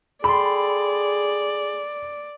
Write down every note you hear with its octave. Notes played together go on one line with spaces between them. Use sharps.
G#4 A4 D5 G5 B5 C6